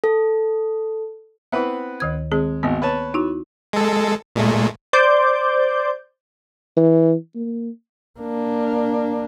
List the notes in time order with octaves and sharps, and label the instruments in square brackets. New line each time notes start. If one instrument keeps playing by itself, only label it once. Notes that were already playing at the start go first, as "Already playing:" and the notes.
[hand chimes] A4
[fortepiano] B3 C4 B4 [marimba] E4 E5
[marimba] D2 D#3 G#6
[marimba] D#3 C4 G#4 [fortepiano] G#3
[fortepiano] G#1 F#4 [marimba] A#3 B3
[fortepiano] B4 C#5 A5
[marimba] D#4 E4 F#4
[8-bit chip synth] G#3 A4
A#2 G#3 A3
[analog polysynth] C5 D5 D6 G6
[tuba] E3
A#3
[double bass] A#3 D4